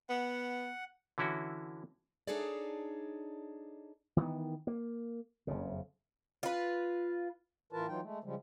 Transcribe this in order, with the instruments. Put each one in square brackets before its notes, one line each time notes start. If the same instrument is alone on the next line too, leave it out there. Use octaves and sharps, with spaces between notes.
[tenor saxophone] B3 [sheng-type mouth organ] F#5
[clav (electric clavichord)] D3 E3 C#4 E4 F#4
[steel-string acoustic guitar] D4 D#4 G#4 A4 C#5 D5
[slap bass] D#3 E3 G3 B3
A#3
F#1 F2 C#3
[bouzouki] F4 B4
[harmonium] A2 E3 F4 A#4 B4 A5
E3 F#3 D#4 F4 G5
G#3 A3
C#3 F3 G3 G#3